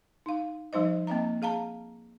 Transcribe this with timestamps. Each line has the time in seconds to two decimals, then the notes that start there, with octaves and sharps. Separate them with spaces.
0.26 D#4 F5
0.73 F3 G3 D#4 C5 D#5
1.07 A#3 C4 D#5 E5 A#5
1.42 G#4 F5 A5 A#5